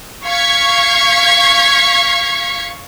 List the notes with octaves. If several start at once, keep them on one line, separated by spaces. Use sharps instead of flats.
F5 C#6 G#6 B6